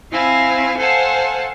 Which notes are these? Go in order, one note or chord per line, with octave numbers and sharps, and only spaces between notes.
C4 E4 F5 G#5
A4 C5 F5 F#5 G#5 A5